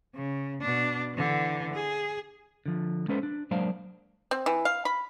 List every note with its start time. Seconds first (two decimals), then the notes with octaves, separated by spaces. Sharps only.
0.15 C#3
0.62 B2 D4
1.14 D3 E3
1.73 G#4
2.66 D3 F3
3.08 G#3 C#4 A4 B4 C5
3.23 D4
3.51 F#3 G#3 A#3 D4 C5 F5
4.31 C4
4.46 E3
4.65 F5
4.85 B5